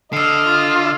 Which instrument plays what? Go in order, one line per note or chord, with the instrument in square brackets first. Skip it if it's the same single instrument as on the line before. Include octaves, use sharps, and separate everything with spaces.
[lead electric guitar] D3 D4 [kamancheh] D#5 F6 [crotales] E6 C7
[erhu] F4